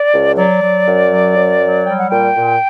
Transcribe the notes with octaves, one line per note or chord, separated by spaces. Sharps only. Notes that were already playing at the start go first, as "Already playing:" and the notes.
Already playing: D5
C#2
F#3 D5
F#3
F#2
F#3
F#2
F#3
G3 G5
F#5
A#2 G5
A#2